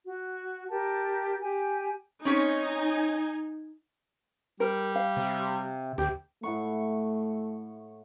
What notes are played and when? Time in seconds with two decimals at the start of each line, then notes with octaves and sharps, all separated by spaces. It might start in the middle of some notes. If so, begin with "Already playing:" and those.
0.06 F#4
0.69 G4 A#4 A5
1.41 G4 G#5
2.25 C4 C#4 D#4 C#5 G#5
4.60 G3 A#4
4.96 F5
5.17 C3
5.98 D2 G4
6.43 A2 A3 F#5 C#6